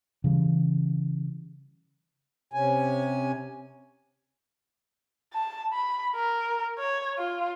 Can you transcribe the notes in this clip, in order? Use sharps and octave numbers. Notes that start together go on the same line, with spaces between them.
C#3 E3 G3
C3 C#4 G#5
A5
B5
A#4
C#5
F4